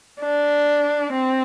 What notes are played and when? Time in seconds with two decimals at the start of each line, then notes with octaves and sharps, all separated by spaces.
0.21 D4
1.13 C4